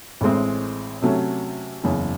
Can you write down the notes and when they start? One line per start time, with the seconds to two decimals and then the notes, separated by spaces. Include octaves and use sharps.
0.21 A1 A2 G#3 C4
1.02 C3 F#3 A3 C#4
1.84 F#1 E2 C#3